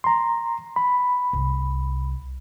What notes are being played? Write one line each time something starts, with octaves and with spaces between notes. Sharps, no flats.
A#5 C6
B5
C2